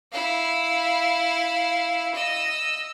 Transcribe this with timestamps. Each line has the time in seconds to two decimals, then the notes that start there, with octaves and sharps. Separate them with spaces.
0.12 E4 F5
2.14 D#5 E6